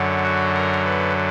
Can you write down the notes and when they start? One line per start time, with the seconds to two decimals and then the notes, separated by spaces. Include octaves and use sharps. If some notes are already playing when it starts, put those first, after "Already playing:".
Already playing: F#2 D3 F#3
0.23 F#4
0.54 A#4
0.85 B4